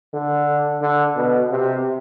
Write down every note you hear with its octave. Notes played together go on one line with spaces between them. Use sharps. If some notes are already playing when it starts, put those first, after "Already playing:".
D3
D3
B2
C3